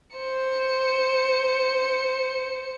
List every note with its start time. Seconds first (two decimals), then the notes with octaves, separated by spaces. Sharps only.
0.16 C5 C#7